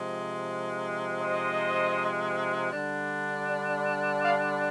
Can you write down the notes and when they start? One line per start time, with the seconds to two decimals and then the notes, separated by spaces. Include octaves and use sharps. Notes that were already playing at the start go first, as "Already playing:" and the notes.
Already playing: C3 F3 G#3
1.21 C5 D#5
2.71 D3 G3 D4
4.21 D5 F5